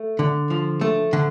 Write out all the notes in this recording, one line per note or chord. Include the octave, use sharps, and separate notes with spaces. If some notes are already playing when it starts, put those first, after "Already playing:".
Already playing: A3
D3
F3
A3
D3